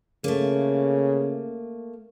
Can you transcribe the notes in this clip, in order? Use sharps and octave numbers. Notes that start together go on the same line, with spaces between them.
C#3 A3 A#3